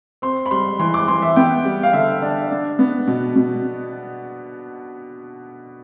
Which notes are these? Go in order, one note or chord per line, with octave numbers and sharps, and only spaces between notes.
C4 C6
B5
G3 C6
E3 C6
D6
E3 C6
E5
B3 G5
G3
F5
D3 E5
D4
D4
B3
B2
B2